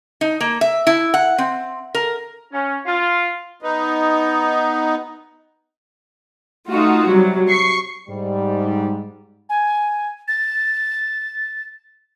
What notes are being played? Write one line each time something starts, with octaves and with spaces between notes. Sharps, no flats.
D#4
A#3
E5
E4
F#5
C4
A#4
C#4
F4
B3 D#4
A3 D#4 F4 F#4
C3 F#3 G3
C#6 C7
G#2 G3
G#5
A6